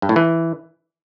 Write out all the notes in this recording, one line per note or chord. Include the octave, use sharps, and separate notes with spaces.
G2
A2
E3